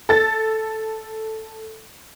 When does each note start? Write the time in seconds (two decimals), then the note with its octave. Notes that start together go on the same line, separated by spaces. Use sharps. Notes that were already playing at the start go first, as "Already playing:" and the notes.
0.09 A4 A6